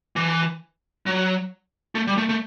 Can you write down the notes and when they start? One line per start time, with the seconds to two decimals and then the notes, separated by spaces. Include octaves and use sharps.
0.16 E3
1.06 F#3
1.95 A3
2.07 G3
2.18 A3
2.29 A3